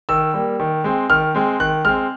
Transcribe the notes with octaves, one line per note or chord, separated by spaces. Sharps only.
D#3 E6
G3 A#3
D#3
G#3 C4
D#3 F6
G#3 C4
D#3 F#6
G#3 C4 F6